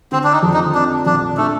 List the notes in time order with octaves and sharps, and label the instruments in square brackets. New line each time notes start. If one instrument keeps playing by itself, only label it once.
[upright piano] D3 [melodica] C4
[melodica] D4
D#4
[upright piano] F2
[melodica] D#4
[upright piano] C4 [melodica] D4
[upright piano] A#1 [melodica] D4
[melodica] A3 [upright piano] D4